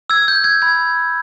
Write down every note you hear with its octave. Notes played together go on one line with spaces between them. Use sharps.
E6 G#6
G6
G6 G#6
B5 G#6